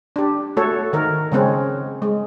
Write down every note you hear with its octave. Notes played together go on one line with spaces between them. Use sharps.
D4 G4
A3 F#4 A4 C#5
D#3 A#4
C#3 G#3 C4 C#4
G#3